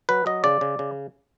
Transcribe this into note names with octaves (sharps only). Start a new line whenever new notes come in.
F#3 B4
F#3 D#5
C#3 D5
C#3
C#3